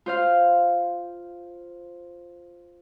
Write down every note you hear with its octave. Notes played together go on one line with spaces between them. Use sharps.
F4 C5 F5